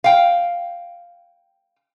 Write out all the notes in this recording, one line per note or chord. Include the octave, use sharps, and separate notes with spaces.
F5 G5